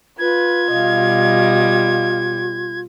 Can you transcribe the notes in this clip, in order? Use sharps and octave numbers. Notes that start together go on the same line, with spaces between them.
F4 B4 G#6
B2 G3 D#5 F5